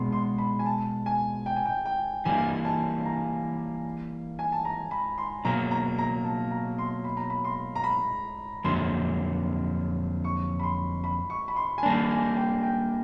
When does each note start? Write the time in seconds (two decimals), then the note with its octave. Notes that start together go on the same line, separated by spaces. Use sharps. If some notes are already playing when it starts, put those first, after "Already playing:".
Already playing: B2 G#3 B3 B5 C6
0.12 C6
0.38 B5
0.59 G#5
0.66 A5
1.06 G#5
1.46 G5
1.56 G#5
1.65 G5
1.85 G5
2.25 E3 G3 A#3 G#5
2.65 A5
3.05 A#5
4.39 G#5
4.52 A5
4.65 A#5
4.91 B5
5.18 C6
5.45 B2 F#3 A#3 A#5
5.71 A#5
5.98 A#5
6.24 A5
6.51 A#5
6.78 C6
7.04 B5
7.17 A#5
7.30 B5
7.44 C6
7.75 A#5
7.84 B5
8.64 F2 D3 F#3 A#3 C6
10.24 C#6
10.59 B5
10.63 C6
11.04 B5
11.30 C#6
11.48 B5
11.56 C6
11.78 G#5
11.83 G3 A#3 D4 A5
12.10 G#5
12.37 G5
12.63 G5